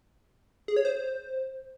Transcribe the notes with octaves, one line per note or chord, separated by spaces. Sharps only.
G#4
C#5
C5